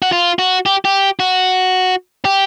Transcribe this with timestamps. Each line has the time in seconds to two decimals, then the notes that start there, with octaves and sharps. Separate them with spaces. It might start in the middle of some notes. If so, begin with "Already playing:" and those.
0.02 F#4
0.12 F4
0.39 F#4
0.66 G4
0.85 G4
1.20 F#4
2.25 G4